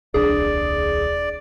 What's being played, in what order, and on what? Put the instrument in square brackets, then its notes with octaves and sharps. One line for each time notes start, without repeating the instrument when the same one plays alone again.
[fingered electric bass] D#1 C2 D4 [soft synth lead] G#4 [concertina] D5